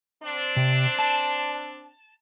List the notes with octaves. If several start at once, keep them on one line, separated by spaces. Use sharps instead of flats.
C4 D4
C3
A5